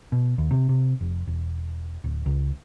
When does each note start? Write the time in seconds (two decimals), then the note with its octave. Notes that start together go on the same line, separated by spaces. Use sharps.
0.12 B2
0.38 D#2
0.51 C3
0.69 C3
1.01 F1
1.27 E1
2.04 D1
2.26 C#2